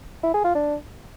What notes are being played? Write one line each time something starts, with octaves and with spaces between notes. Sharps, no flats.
E4
G#4
F4
D4